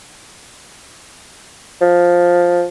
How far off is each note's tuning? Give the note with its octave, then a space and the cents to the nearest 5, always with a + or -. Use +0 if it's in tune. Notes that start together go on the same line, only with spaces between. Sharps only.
F3 +10